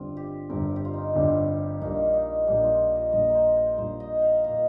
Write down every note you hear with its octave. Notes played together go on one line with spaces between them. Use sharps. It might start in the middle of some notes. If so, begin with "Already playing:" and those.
Already playing: G1 G2 G3 C4 F4
G4
G1 G2 G3 C4 A#4
G4
F4
D#4
G1 G2 G3 C4
A#1 A#2 G3 A#3 D#4
D#4
A#1 A#2 G3 A#3 D#4
F4
D#5
A#1 A#2 G3 A#3 D#5
A#4 C5
C5
A#1 A#2 G3 A#3 C5
D#5
F5 G5
A#2 A#3 D#5